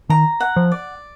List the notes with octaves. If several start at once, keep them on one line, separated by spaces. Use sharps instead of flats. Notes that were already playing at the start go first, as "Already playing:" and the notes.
D#3 A#5
F#5
F3
D5